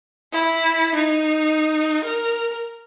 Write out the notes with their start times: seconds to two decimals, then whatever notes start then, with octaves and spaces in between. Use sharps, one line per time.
0.33 E4
0.95 D#4
2.04 A#4